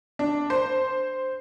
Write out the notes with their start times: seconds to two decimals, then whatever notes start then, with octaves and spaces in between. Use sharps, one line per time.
0.19 D4
0.50 C5